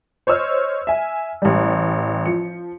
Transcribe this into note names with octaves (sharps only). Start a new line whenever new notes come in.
C5 C#5 D#5 E6 F6
E5 G#5
A1 G3
F3 C#7